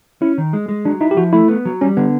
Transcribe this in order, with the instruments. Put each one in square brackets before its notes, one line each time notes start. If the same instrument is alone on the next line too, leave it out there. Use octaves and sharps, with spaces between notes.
[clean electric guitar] C#4 [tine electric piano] E4
[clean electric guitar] D#3
G#3
G#3
[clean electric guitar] F#3 [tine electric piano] D4
[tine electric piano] D#4 [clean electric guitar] E4
[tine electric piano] G4
[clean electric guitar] F3 [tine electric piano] F#4
[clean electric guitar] A3 [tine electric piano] E4
[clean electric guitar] B3
F#3
[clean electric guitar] G3 [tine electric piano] C#4
[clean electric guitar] D3 [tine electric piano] B3